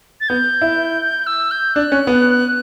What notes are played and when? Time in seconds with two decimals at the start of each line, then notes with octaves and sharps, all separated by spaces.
0.21 A6
0.29 B3 G6
0.62 E4
1.27 E6
1.51 G6
1.75 D4 F#6
1.92 C#4
2.07 B3